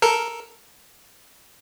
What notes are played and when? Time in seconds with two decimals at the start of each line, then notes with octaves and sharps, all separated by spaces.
0.02 A4 A#4